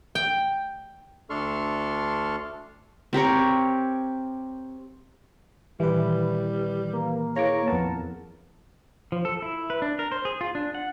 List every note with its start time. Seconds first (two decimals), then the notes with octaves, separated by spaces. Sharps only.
0.15 G5
1.30 D2 D4 A4 C6 C#6 F6
3.13 C4 G4 A#4 C#5
5.80 A#2 D#3 E3 G3 B4
6.93 A#3
7.36 E4 G#4 C#5 F5 A#5 D6
7.68 F2 B3 A#4 A5
9.12 F3
9.25 A4
9.42 E4
9.70 B4
9.82 D4
9.99 A#4
10.12 C5
10.25 G#4
10.41 F4
10.55 D4
10.75 F#5